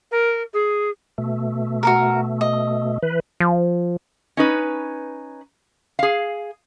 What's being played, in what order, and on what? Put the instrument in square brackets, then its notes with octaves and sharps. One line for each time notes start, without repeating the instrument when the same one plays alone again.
[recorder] A#4
G#4
[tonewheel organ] B2 A3
[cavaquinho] F#4 A4 A#4
D#5
[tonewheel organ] E3 B4
[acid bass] F3
[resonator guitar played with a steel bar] C#4 D#4 B4
G#4 F5